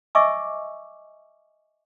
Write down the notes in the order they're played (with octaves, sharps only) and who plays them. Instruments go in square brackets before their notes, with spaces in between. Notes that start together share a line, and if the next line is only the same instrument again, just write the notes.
[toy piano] D#5 E5 G#5 C#6 D6 E6